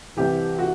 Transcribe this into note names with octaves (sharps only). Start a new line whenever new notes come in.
C2 C3 E3 G4
F#4